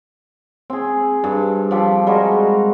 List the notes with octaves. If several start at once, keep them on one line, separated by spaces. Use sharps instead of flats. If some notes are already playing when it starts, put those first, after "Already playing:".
C4 G#4
G2
F3 G4 A4
G3 G#3 F#4 A#4